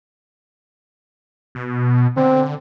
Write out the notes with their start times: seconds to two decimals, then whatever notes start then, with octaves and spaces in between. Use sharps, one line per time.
1.55 B2
2.17 D3 C4